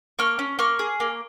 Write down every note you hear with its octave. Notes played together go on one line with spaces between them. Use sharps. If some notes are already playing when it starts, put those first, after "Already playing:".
A#3 C#6 F6
C#4
A#3 C#6 F6
G#4
A#3